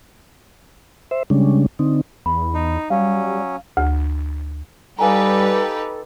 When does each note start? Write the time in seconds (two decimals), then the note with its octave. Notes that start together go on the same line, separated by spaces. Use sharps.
1.11 C5 E5
1.30 C#3 G3 G#3 C#4 D4
1.79 D3 C4 D#4
2.26 E2 B5
2.54 D#4
2.90 F#3 G3 C#4 F5
3.77 D2
4.99 G3 D#4 G4 A4 B4 F5 G#5 A#5